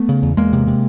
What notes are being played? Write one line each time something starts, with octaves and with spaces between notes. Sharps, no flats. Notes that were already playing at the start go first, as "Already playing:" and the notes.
Already playing: A3 B3
C#3
E2
E2 G#3 A#3
C3
C3